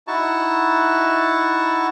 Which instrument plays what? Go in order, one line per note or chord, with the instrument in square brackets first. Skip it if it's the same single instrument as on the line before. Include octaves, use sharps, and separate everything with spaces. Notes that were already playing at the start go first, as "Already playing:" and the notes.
[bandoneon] D#4 E4 F#4 A5 C#6